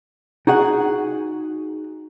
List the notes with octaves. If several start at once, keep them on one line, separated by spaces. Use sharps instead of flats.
D#4 F#4 G#4 F#5